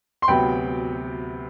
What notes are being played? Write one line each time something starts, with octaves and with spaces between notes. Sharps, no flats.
C6
D2 C3 F#3 B3 G5 B5